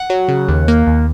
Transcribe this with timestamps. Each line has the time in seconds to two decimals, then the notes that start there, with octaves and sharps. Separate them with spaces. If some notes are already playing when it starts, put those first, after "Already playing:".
Already playing: F#5
0.10 F#3
0.28 C#3
0.48 D#2
0.68 A#3
0.87 D#2